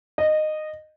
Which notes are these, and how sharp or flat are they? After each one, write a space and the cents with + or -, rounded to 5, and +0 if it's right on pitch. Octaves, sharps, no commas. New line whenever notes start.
D#5 -15